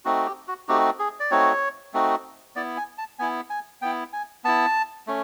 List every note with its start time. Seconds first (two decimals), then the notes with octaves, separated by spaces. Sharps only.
0.05 A3 C4 D#4 F#4
0.26 G4
0.48 F#4
0.68 A3 C4 D#4 F#4 G4
0.99 G#4
1.20 D5
1.31 A3 C4 D#4 F#4 C#5
1.94 A3 C4 D#4 F#4
2.56 B3 E4 D5
2.77 G#5
2.98 A5
3.19 B3 E4 G#5
3.50 G#5
3.82 B3 E4 G5
4.13 G#5
4.44 B3 E4 A5
5.07 A3 C#4